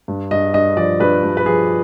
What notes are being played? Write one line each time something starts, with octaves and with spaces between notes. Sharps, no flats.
G2
G2 D#5
G2 D#5
F3 D5
G2 B4
G2
B4
F3 G#4